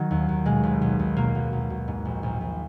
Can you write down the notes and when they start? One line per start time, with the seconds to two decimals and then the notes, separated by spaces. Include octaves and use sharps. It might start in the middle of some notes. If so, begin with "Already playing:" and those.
Already playing: D#3 F#3
0.11 D#2
0.29 D#2
0.45 B2 G#3
0.63 B1
0.82 B1
0.99 B1
1.17 B2 A#3
1.35 B1
1.53 B1
1.70 B1
1.88 G#2
2.05 A#1
2.23 A#1
2.41 A#1